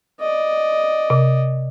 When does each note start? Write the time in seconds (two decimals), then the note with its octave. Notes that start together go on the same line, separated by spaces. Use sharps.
0.20 D5 D#5
1.10 C3